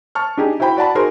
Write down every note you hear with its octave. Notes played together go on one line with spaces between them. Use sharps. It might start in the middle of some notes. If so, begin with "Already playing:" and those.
A5 C#6 F6
D4 D#4 G4 G#4
E4 F#4 C5 G5 B5
F#4 D5 F#5 A5 B5
D#4 F#4 G#4 A#4 C5 C6